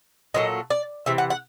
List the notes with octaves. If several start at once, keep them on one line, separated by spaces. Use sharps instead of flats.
A#2 F#3 A3 D#5
D5
C3 E3 E5
F#5
F#5